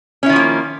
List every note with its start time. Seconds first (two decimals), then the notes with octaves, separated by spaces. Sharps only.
0.23 C#4
0.26 E4
0.29 D#3
0.33 F3
0.36 A#3